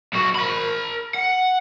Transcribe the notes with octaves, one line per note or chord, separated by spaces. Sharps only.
B1 F#4
A#4 B5
F#5